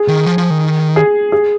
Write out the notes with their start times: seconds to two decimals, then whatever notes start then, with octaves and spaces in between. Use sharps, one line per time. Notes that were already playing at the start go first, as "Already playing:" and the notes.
Already playing: G#4
0.08 D#3
0.26 F3
0.38 F3
0.50 D#3
0.96 G#4
1.32 G#4